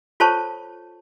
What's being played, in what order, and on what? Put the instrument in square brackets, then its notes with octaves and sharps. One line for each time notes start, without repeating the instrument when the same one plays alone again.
[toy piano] F4 A4 C5 C#5 A5 C#6